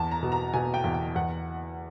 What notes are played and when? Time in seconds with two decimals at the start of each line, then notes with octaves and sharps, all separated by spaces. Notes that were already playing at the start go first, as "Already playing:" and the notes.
Already playing: E2 A5
0.11 A#5
0.23 B2
0.32 A#5
0.54 B2 G#5
0.74 G5
0.84 E2
0.94 G5
1.15 E2 F#5